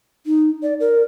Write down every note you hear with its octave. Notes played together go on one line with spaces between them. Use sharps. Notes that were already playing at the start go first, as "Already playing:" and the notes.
D#4
D5
A#4